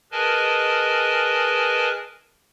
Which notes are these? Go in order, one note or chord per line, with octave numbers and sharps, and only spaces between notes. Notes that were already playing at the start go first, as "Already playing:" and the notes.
G#4 A#4 B4 D#5 G#5 A5